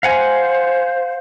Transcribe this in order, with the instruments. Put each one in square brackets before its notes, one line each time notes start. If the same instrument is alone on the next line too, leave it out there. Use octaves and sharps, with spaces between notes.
[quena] C5 [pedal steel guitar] F5 F#5 G#5